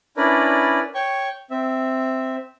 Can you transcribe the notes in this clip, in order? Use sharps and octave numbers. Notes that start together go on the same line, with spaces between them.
C#4 D4 E4 A#4 B4 D5
C#5 G5 C#6
C4 E5